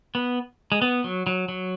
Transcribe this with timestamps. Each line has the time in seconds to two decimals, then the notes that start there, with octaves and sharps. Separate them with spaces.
0.15 B3
0.72 G#3
0.82 B3
1.04 F#3
1.27 F#3
1.49 F#3